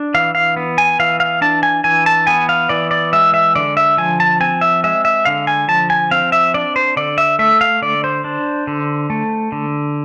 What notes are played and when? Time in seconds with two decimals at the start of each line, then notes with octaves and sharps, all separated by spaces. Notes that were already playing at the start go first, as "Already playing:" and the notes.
Already playing: D4
0.14 E3 F5
0.35 F5
0.56 B3
0.78 G#5
0.99 E3 F5
1.20 F5
1.41 D4 A5
1.63 G#5
1.84 E3 G#5
2.06 A5
2.27 B3 G#5
2.49 F5
2.69 E3 D5
2.91 D5
3.13 G#3 E5
3.34 E5
3.55 D3 D5
3.77 E5
3.97 F3 G#5
4.20 A5
4.40 C4 G#5
4.61 E5
4.84 G#3 E5
5.05 E5
5.25 D3 F5
5.47 G#5
5.68 F3 A5
5.90 G#5
6.11 C4 F5
6.32 E5
6.54 D4 D5
6.76 C5
6.97 D3 D5
7.18 E5
7.39 A3 E5
7.61 F5
7.82 D3 D5
8.04 C5
8.24 D4
8.67 D3
9.10 A3
9.52 D3